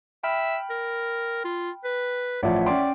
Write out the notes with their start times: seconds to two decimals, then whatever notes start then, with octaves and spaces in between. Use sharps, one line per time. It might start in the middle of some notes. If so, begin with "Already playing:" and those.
0.24 E5 G5 B5 F6
0.70 A#4
1.44 F4
1.84 B4
2.43 A1 F3 C#5 D5 E5 F#5
2.66 C#4 D5 G5 C6